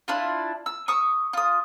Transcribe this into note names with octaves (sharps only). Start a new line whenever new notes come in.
D4 E4 F4
E6
C#6 D#6 E6
F4 D#6